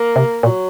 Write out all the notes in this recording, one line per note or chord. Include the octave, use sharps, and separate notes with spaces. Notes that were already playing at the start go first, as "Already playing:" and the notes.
Already playing: A#3
C3
A#2 F#3